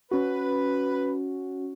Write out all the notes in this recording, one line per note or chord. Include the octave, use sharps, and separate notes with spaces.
C#4 F#4 B4